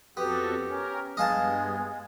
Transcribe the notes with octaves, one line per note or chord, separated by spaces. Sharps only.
F2 B3 F#4 G4 A4
C#4 A#4
G2 G#3 B3 D#5 F5 A5